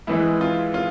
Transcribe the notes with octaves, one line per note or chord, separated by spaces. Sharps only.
G#2 E3 G#3 E4
F4
F4